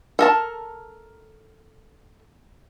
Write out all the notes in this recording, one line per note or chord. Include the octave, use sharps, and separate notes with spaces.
A4 A#4 A5